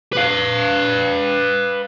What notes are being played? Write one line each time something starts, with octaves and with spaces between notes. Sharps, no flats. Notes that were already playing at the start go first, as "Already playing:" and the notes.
B4 F5